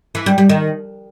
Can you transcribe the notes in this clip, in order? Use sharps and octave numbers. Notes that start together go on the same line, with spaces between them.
E3
G3
G3
D#3